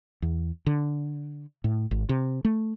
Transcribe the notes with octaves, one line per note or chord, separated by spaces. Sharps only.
E2
D3
A2
G#1
C3
A3